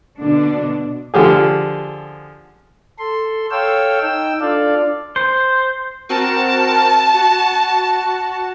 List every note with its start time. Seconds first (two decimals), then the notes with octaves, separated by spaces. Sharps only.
0.20 B2 D3 D4
1.14 D3 F3 G4 G#4
2.99 A4 C6
3.51 A4 C#5 F5 G5 E6
4.02 D#4 G5 E6
4.41 D4 F4 A4 D5 F5
5.16 C5
6.09 C4 F#4 A#4 A5
7.14 F#4